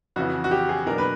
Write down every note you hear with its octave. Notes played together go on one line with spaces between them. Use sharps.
F2 C#3 E3 F#4
F#4
G4
G#4
B2 F#3 A#3 D4 A#4
B4